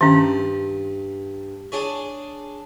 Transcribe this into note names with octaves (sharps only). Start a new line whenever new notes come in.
G2 D#3 C#4
D4 G#4 C#5